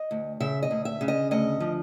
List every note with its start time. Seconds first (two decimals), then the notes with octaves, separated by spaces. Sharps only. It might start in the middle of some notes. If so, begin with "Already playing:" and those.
Already playing: D#5
0.11 D2
0.40 C#3 E5
0.63 D#5
0.71 D2
0.85 E5
1.01 C#3
1.08 D#5
1.31 D2 D#5
1.60 F3